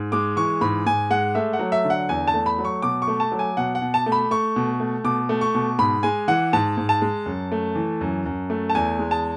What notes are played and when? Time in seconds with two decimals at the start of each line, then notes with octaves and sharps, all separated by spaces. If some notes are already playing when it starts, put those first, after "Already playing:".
Already playing: G#2
0.12 G#3 D6
0.36 E3 C#6
0.61 G#2 B5
0.86 G#2 G#5
1.10 G#3 F#5
1.35 A3 E5
1.53 F#5
1.59 F#3
1.72 E5
1.85 D3
1.90 F#5
2.09 E2 G#5
2.28 A5
2.34 A3
2.46 B5
2.59 F#3
2.65 C#6
2.82 B2 D6
3.02 C#6
3.07 A3
3.20 A5
3.32 F#3
3.39 G#5
3.57 B2 F#5
3.75 F#5
3.82 B2
3.94 A5
4.06 A3
4.12 B5
4.31 A3 C#6
4.56 B2
4.80 A3
5.04 B2 D6
5.29 A3
5.41 C#6
5.54 B2
5.79 G#2 B5
6.03 G#3 G#5
6.28 E3 F#5
6.53 G#2 A5
6.77 G#2
6.89 A5
7.02 G#3
7.26 F#2
7.52 A3
7.75 E3
8.01 F#2
8.26 F#2
8.50 A3
8.70 A5
8.75 E2 G#5
8.99 G#3
9.11 A5